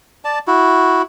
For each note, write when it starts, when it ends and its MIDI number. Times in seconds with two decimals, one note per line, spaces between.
0.25 0.39 74
0.25 0.39 81
0.47 1.02 64
0.47 1.02 66